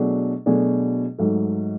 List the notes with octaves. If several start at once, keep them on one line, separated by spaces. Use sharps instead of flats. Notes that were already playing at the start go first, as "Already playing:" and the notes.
Already playing: B2 F#3 A3 D4 G#4
B2 F#3 A3 D4 G#4
G#2 F#3 A3